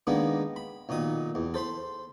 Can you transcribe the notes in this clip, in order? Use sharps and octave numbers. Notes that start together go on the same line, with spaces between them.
D#3 G#3 A#3 B3 D4
B5
B1 A#2 D#3 D#6
E2
A4 C5 B5 C6